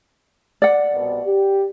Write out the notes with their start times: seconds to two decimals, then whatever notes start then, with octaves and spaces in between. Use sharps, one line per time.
0.62 D5 F#5
0.93 C2 B2
1.26 G4